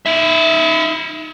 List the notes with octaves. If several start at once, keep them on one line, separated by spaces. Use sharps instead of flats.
D#4 E5